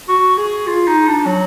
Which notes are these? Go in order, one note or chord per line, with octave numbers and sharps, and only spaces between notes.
F#4
G#4
F4
D#4
D4
F#3